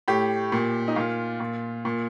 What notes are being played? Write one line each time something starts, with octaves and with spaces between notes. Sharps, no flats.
A2 G4
A#2
D#4
A#2 F4
A#2
A#2